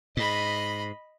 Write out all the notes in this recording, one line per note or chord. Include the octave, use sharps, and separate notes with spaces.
G#2 D#5 B5